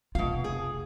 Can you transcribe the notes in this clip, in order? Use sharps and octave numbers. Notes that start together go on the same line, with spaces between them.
F1 B2 F4 F5
G#4